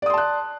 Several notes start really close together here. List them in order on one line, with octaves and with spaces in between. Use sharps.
D5 D#6 C6 A5 F#6